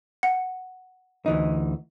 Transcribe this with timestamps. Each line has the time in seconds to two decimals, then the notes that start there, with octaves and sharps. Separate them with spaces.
0.23 F#5
1.26 D2 E3 D#4